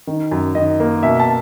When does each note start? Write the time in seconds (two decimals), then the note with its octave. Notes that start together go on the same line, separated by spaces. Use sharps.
0.07 D#3
0.31 F#2
0.55 D#3 D#5
0.80 A#3
1.03 B2 E5
1.20 A5